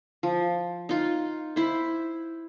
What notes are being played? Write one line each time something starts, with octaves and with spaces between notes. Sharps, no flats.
F3
D#4 F4
E4 C5